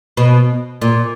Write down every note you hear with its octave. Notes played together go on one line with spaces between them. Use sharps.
B2
A#2